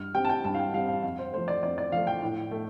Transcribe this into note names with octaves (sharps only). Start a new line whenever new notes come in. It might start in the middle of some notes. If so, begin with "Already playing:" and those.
Already playing: G2 F6
G3 C4 G5
A5
G5
G2 A5
F5
G5
G3 C4 F5
F5
F2 F5
C5
F3 A3 C5
D5
F2 D5
D5
F3 A3 F5
G5
A2
A3